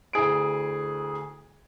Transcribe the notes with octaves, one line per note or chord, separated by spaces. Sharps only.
D2 E4 G#4 D7